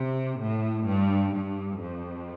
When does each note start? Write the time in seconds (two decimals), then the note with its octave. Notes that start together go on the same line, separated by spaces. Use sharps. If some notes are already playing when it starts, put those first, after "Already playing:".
Already playing: C3
0.41 A2
0.88 G2
1.35 G2
1.82 F2